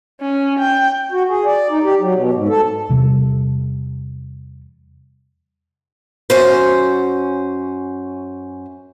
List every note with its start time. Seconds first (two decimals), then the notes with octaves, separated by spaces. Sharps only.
0.21 C#4
0.59 G5
1.12 F#4
1.28 G#4
1.45 D5
1.70 D#4
1.84 G4
2.00 F#3
2.14 B2
2.33 G#2
2.48 A4
2.89 E2 C3 G3
6.30 F#2 C#4 C5